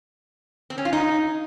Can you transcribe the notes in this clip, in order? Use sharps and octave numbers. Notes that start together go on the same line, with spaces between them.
C4
C#4
F4
D#4